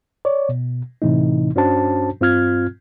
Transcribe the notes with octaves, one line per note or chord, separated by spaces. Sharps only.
C#5 D5
B2
A2 C3 E3 A3 D#4
G2 C#4 D4 F#4 C5 A5
G2 C4 F4 F6 G#6